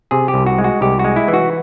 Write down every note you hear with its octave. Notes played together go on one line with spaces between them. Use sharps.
C3 G#4
G4
C2
F#4
G#3
F#4
C2 G4
F#4
G#3
E4
E3
F#4